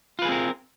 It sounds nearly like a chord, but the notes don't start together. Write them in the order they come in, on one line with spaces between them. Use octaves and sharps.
F4 B4 G#4 C4 A#4